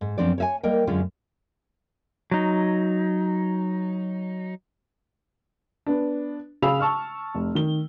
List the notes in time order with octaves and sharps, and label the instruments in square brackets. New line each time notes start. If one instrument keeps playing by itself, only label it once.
[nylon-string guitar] G#2
F#2 F3 B3 C4 D4 D5
C#5 E5 G#5
G3 A#3 A#4 D#5 G5
F#2 D3 G#3 C#4 F4
[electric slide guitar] F#3 D#4
[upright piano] B3 D4
C#3 G#4 F5 B5 E6 F7
A5 C#6 E6 F6
F1
D#3 G7